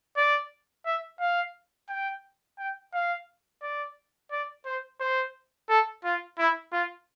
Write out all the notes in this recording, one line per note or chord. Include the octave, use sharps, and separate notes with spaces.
D5
E5
F5
G5
G5
F5
D5
D5
C5
C5
A4
F4
E4
F4